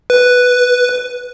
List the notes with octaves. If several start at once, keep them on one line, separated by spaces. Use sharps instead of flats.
B4